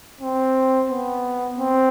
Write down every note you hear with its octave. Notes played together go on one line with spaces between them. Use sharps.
C4
B3
C4